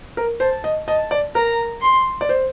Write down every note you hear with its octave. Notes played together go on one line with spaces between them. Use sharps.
A#4
C5 A5
D#5
D#5 A5
D5
A#4 A#5
C6
D5
C5